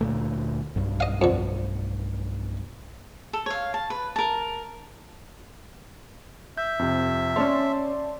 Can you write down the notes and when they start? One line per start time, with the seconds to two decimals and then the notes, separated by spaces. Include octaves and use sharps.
0.01 D2 A#2 A3
0.76 B1 G2
1.00 D#5 F5
1.22 F2 D3
3.33 A4
3.46 C#5 F5
3.74 A5
3.90 B4
4.16 A#4 A5
6.57 E5 G6
6.79 F2 C3
7.36 C#4 D4 C#5 D5 A5 C6